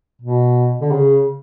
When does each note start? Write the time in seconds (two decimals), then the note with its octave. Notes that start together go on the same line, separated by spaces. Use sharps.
0.21 B2
0.81 D3
0.91 C#3